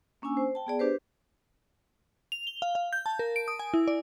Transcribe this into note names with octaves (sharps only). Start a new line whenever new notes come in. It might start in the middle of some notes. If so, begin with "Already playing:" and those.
A#3 C#4 D4 G#5 E6
C5
G5 A5
B3 G#4 D5
D4 G4 B4 C5
F7
G7
F5
F5
G6
A5
A#4
D7
D#6
G#5
E4
D5